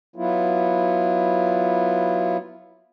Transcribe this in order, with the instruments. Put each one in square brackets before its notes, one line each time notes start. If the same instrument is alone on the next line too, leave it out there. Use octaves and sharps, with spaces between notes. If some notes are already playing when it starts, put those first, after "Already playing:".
[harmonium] F#3 B3 E4 F4